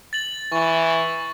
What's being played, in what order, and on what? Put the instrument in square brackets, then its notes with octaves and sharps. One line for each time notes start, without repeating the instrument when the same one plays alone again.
[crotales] A6 F#7
[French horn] E3 [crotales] C#6